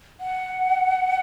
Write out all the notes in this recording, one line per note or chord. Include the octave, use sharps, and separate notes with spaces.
F#5